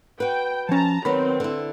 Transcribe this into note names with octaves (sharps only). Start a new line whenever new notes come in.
F#4 B4 G5
F3 C#4 A5 A#5
D#3 F#3 B3 C4 B5
D3 E4